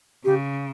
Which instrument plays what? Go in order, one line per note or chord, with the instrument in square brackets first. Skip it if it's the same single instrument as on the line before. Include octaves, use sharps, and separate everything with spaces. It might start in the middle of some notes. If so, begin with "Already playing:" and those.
[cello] C#3 [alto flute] G4